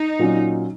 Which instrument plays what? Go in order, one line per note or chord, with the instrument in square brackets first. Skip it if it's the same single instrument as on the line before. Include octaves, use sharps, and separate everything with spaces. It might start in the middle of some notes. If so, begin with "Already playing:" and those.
Already playing: [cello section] D#4
[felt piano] A#2 F#3 C#4